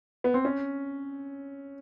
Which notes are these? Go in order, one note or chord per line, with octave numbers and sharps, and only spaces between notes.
B3
C4
C#4